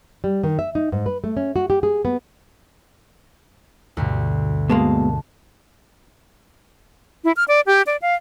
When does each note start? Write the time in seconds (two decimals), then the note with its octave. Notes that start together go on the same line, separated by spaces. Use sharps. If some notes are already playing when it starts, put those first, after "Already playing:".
0.24 G3
0.44 D#3
0.59 E5
0.75 D#4
0.92 G#2
1.06 B4
1.24 A3
1.37 C#4
1.56 F#4
1.70 G4
1.83 G#4
2.05 B3
3.97 D2 G2 B2
4.70 B2 G#3 A#3 A5
7.24 E4
7.36 F6
7.48 D5
7.67 G4
7.87 D5
8.02 F5